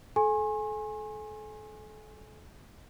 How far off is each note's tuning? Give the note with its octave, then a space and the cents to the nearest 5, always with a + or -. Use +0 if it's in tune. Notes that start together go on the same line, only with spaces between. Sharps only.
A4 -35 G#5 +0 C6 +45